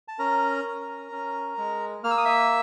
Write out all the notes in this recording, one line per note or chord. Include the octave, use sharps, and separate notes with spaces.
A5
C#4 A#4 A#5
C#4
C#4
G#3
A#3 F6
E6
D#6
E5 E6